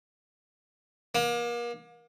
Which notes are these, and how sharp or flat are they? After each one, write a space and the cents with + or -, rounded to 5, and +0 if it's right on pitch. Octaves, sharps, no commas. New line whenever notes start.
A#3 +35